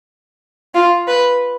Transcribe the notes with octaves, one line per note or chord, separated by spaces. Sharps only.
F4
B4